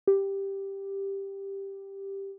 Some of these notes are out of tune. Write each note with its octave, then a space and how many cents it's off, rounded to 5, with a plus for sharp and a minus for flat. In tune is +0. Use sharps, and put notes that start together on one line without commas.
G4 +0